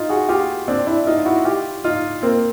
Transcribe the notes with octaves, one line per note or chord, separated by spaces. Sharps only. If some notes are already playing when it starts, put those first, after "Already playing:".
Already playing: D#4 F4
F#4 G#4
F4 G4
C4 D4
D4 E4
D#4 F4
E4 F#4
F4 G4
D#4 F4
A#3 C4